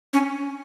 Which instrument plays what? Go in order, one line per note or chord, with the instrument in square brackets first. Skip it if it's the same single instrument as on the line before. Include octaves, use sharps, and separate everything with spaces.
[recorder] C#4